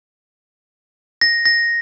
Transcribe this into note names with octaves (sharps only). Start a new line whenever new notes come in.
A#6
A#6